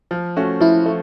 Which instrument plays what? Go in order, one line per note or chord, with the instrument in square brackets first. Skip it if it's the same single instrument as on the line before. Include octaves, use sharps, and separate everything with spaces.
[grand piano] F3
A3 C#4 F#4
[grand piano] F3 [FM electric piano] E4
[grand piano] A3